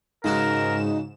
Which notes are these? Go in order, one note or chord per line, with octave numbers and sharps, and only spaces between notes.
G#2 C#3 G#3 D#4 F#4 A#4 E7